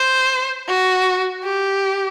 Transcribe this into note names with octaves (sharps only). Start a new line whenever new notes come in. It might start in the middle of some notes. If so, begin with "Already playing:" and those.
Already playing: C5
F#4
G4